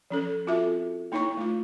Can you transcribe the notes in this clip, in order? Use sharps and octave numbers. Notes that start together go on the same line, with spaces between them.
F3 C#4 A4
C4 F4 F#4 A4 E5
A#3 D#4 E4 C#5 A#5 C#6
A3 F4